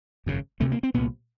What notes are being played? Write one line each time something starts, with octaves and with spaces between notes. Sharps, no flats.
G#1 F#2 C#3
D2 C3 A3
A#3
C4
C2 A#2 B3